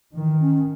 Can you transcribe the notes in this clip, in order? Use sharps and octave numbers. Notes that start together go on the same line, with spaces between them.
D#3 E3
C#4